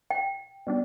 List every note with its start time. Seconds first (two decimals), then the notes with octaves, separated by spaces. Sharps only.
0.10 G5
0.67 B2 G3 D4